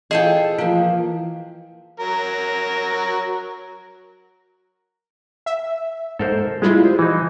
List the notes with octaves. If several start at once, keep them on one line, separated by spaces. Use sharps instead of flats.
E3 F4 G#4 A4 D#5 E5 G5
F3 A#3 F4
F#3 A#4
E5
G#2 A4 A#4 C5
G3 G#3 E4 F4
C5
E3 D#4